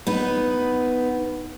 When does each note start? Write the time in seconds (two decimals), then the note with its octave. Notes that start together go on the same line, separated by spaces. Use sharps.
0.07 B3 D#4 B4